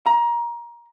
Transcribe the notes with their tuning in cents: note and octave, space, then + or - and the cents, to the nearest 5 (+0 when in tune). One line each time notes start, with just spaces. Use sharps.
A#5 +20